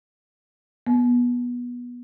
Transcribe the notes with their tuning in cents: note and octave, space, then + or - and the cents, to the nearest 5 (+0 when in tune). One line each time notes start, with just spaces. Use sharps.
B3 -20